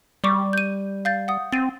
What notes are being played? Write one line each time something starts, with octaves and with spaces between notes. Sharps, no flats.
G3 D5 C#6 D6
G6 D#7
F5 G6 A6
F#5 D#6
C4 A6 D#7